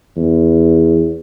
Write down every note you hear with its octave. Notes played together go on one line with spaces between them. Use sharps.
E2